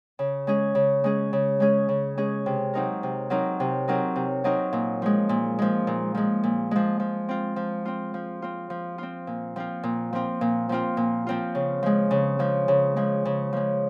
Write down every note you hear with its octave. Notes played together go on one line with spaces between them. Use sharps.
C#3
G#3 C#4 G#4
C#3
G#3 C#4 G#4
C#3
G#3 C#4 G#4
C#3
G#3 C#4 G#4
C3
F#3 C4 D#4 A#4
C3
F#3 C4 D#4 A#4
C3
F#3 C4 D#4 A#4
C3
F#3 C4 D#4 A#4
A#2
F3 G#3
A#2
F3 G#3
A#2
F3 G#3
A#2
F3 G#3
F3
C4 F4
F3
C4 F4
F3
C4 F4
F3
C4 F4
A#2
F3 C4 F4
A#2
F3 C4 F4
A#2
F3 C4 F4
A#2
F3 C4 F4
C#3
F3 G#3
C#3
F3 G#3
C#3
F3 G#3
C#3
F3 G#3